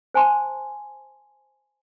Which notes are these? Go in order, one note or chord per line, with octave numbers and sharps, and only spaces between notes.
C5 G#5 A5 C6